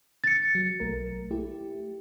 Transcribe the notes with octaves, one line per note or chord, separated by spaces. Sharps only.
A6 C#7
F#3
B1 A3 A#4
A3 E4 G4